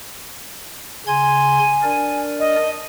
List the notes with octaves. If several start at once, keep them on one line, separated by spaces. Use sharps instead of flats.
C#3 G#5 C6 G#6
D4 A#4 D5
D#5